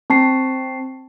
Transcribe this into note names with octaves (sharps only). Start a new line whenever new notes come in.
C4 A5 C7